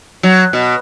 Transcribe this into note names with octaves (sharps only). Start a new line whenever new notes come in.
F#3
B2